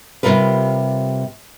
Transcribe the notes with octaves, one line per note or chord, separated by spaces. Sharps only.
C3 E3 G3 F4 A#4 B4